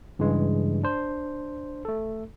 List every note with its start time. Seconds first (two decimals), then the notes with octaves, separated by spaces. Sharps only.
0.19 G2 C#3 E3 G#3
0.83 D4 C5
1.85 A3 A4